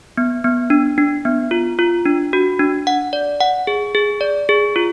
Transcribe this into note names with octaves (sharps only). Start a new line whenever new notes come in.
B3
B3
D4
D4
B3
F4
F4
D4
F#4
D4
F#5
D5
F#5
G#4
G#4
D5
G#4
F4